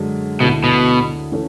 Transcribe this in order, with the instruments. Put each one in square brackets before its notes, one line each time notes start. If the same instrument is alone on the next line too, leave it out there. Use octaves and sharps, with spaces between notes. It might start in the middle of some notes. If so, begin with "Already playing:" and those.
Already playing: [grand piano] F#2 D3 G#3
[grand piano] D2 D3 A3 E4 [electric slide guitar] B2
[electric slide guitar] B2
[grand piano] E3 A3 C#4